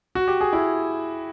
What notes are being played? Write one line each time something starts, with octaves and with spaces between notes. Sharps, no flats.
F#4
G4
G#4
E4